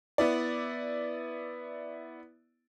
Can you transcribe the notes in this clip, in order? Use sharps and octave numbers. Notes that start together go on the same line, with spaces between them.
B3 E4 D5